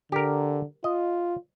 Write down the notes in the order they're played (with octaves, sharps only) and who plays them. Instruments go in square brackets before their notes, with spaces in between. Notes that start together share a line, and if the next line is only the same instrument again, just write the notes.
[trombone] D3 [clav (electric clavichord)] G4 A#4
[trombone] F4 [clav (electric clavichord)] D#5